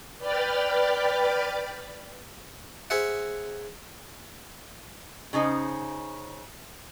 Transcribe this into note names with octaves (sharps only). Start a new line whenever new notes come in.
B4 D5 G5 B5 F6 A6
G#4 C5 E5 F#5
C#3 C#4 D#4 C5